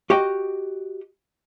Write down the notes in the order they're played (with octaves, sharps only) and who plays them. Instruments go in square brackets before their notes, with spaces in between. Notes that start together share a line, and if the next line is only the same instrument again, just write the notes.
[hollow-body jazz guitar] F#4 G4 D#5 G5